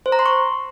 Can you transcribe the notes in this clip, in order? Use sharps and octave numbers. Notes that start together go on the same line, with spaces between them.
C5
A#5
C6
C#6